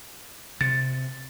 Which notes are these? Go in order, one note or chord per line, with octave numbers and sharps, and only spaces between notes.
C3 A6